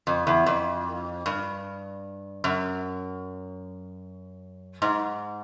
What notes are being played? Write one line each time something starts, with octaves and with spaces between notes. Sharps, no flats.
F2
E2
F2
G2
F#2
G#2